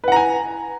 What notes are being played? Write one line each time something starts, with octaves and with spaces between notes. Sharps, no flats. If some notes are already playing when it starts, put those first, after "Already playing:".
B4 F#5 G#5 A#5